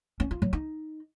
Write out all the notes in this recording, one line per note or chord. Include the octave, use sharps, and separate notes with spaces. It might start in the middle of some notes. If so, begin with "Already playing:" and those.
C#4
F4
F#3
D#4